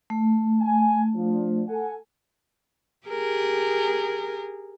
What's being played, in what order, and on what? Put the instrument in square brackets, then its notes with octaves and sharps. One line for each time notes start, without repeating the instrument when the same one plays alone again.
[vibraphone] A3
[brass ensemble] G#5
F3 D4
A4 F#5 G#5
[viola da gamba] G4 G#4 A#4